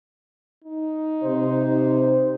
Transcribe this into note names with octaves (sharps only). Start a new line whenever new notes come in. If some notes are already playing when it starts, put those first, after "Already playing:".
D#4
C3 C5